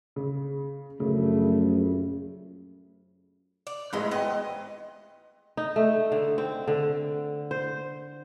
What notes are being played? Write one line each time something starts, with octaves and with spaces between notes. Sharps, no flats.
C#3
A#1 F#2 C#3 A3
D5
A1 G#2 G#3 B3 D#4 E4 D#5 C6
B3 C4 F#4 D#5
D#4
A3
D3
C4
D3
C5